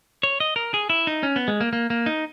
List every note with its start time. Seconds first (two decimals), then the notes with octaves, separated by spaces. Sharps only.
0.23 C#5
0.40 D#5
0.56 A#4
0.74 G#4
0.90 E4
1.07 D#4
1.23 C#4
1.36 B3
1.48 G#3
1.61 A#3
1.73 A#3
1.90 A#3
2.06 D#4